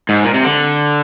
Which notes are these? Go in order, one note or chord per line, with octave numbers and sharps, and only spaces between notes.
G#2
A#2
C3
D3